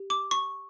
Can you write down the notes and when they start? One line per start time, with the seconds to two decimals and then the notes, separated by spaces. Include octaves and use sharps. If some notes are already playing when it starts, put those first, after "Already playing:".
Already playing: G4
0.10 D6
0.31 C#6